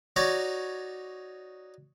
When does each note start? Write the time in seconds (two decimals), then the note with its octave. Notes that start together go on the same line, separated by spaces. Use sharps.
0.16 D#4 F#4 C#5 D5